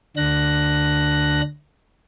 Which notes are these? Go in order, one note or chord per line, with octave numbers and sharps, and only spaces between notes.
D2 D3 D4 F#6 A#6